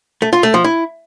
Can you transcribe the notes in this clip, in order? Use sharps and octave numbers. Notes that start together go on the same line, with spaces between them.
A3
F4
A3
F3
E4